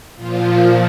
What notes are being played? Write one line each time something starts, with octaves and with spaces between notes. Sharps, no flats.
A#2 F3 F4